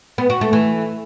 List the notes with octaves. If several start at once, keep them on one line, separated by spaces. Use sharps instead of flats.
B3
F#4
A3
E3